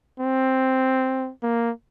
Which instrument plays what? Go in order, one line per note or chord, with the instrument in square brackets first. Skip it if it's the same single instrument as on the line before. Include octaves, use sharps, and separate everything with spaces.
[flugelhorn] C4
A#3